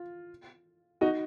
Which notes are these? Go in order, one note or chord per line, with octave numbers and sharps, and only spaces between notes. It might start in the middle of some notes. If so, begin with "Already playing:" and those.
Already playing: F4
D#4 F#4